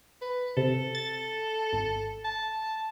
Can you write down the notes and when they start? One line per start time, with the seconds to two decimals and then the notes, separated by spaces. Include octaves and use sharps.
0.21 B4
0.57 C3 A4
0.95 A6
1.72 G#1
2.24 A5